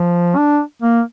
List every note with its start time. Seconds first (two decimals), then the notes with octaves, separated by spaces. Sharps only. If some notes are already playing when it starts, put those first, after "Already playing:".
Already playing: F3
0.36 D4
0.82 A#3